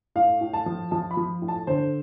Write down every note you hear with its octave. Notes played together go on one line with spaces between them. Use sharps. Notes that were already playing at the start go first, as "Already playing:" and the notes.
A2 F5
A2
A5
F3
F3 A5
B5
F3
A2
A5
D3 C5